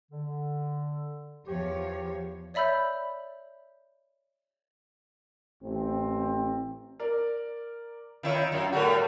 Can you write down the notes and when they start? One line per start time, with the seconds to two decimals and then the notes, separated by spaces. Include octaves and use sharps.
0.11 D3
1.46 E2 F3 G4 C#5
2.54 C#5 D5 E5 B5 E6 G6
5.63 A1 C4
6.99 A#4 D5
8.23 D#3 E4 F4 C#5
8.52 F#2
8.72 A2 G3 F#4 G4 A4 A#4